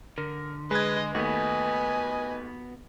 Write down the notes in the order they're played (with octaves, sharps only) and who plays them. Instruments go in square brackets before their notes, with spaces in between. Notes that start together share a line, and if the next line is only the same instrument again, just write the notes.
[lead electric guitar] D3 [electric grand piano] A#4
[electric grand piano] G#3 G#6 [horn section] B4 [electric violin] D#5
[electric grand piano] D#2 A3 [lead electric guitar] B3 F#4 [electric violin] B4 [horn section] D#5 G#5